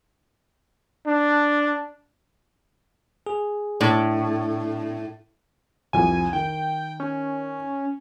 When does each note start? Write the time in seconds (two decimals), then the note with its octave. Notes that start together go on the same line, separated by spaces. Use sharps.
1.07 D4
3.27 G#4
3.81 A2 D4
5.93 C2 F2 G#5
6.33 D#3 G5
7.00 C#4